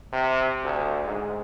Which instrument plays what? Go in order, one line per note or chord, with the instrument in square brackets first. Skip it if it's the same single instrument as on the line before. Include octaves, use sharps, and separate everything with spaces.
[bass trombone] C3
D2
G#2